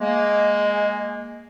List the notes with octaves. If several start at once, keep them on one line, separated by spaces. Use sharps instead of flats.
G#3 A#3